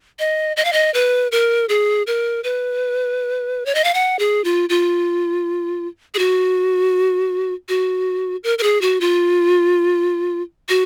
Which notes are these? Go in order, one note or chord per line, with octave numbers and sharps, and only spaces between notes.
D#5
D#5
F5
D#5
B4
A#4
G#4
A#4
B4
C#5
D#5
F5
F#5
G#4
F4
F4
G#4
F#4
F#4
A#4
A#4
G#4
F#4
F4
F#4